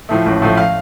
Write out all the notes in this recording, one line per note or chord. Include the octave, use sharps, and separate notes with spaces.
A2 F3 A3
A1
A2 F3 A3
F5